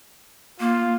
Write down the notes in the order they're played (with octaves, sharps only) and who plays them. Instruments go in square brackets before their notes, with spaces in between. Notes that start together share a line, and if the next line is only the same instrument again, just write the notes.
[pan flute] A#3 [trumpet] F4